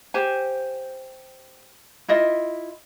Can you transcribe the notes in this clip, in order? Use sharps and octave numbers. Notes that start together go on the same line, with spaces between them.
G4 C5 G#5
E4 F4 D#5 E5